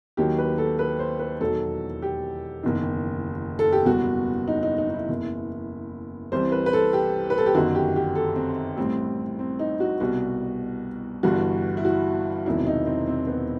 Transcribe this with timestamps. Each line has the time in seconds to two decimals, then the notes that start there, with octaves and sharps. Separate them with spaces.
0.17 D#2 D#3 F#3 G4
0.39 B4
0.58 A4
0.79 B4
0.99 C5
1.19 B4
1.41 E1 E2 D#3 F#3 A4
2.02 G4
2.63 F#1 E2 D#3
3.59 A4
3.72 G4
3.85 F#1 E2 B2 G3 F#4
4.48 D#4
4.63 D#4
4.78 D#4
4.89 D#4
4.94 E4
5.09 F#1 E2 B2
6.32 C2 C3 E3 G3 C5
6.52 B4
6.66 B4
6.73 A4
6.93 G4
7.30 B4
7.38 A4
7.46 G4
7.54 G1 F#2 D#3 F#4
7.75 G4
7.96 G4
8.15 A4
8.36 C4
8.77 A1 A2 G3 C4
9.39 C4
9.59 D#4
9.80 F#4
10.00 C2 B2 G3 F#4
11.23 G1 G2 E3 G3 F#4
11.77 E4
11.85 F#4
12.45 E1 E2 C3 D#3 F#3 E4
12.67 D#4
12.87 C4
13.07 C4
13.27 B3